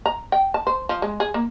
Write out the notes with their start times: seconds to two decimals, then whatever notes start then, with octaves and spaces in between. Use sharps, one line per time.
0.06 A#5
0.32 G5
0.54 A5
0.67 C5
0.89 F3
1.02 G#3
1.20 G#4
1.34 A#3